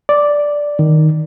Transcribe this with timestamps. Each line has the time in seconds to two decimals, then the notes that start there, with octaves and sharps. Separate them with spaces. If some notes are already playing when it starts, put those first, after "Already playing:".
0.09 D5
0.79 D#3